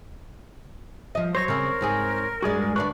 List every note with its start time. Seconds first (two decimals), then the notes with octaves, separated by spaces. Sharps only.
1.15 F3 D#5
1.35 F#3 C5 C#5 C#6 A#6
1.48 C#3 C4 A#4
1.81 G#2 C4 G#4
2.42 G2 G#3 F#4 G#4 D5
2.76 D2 D4 B4 D5 C#6 F#6